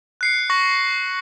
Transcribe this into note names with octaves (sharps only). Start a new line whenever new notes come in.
F#6 C7 C#7
C#6 A#6 F#7